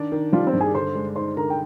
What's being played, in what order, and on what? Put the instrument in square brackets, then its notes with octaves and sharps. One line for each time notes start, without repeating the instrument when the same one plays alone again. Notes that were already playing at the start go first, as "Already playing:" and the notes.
Already playing: [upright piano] D#3 D4
D#3
[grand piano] F3 F4 [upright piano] G3
[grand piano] C4 C5
[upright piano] G2
[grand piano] G#4 G#5
[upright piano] D3 [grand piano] C5 C6
[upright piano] G#3
[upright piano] D#4 [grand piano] C5 C6
[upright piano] D3 [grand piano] A#4 A#5
[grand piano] G5